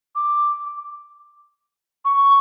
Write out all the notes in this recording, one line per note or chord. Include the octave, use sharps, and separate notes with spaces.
D6
C#6